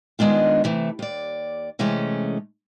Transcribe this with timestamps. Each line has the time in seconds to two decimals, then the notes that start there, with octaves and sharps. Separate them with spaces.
0.19 D#3 G#3 B3 D4 F4
0.64 C3 E3 A3
0.99 D#2 D5
1.79 C3 E3 G#3 A3 C#4